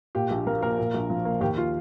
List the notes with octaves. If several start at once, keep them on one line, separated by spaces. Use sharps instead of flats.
A#2 G4
A#1
F3 A#4
A#3 A#4
A#2
A#1
F3
A#3
D#2 G4
F4